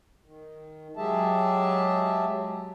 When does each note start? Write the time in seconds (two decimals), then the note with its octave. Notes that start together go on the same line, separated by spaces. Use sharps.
0.24 D#3
0.97 F#3 G#3 G4 G#4 E5 A5